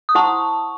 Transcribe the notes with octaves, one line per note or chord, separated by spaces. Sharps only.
D#6
E4 C5 F#5 A5 C6 C#6